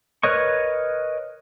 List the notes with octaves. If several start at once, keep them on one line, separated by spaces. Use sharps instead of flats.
A#4 B4 C#5 D#5 C#6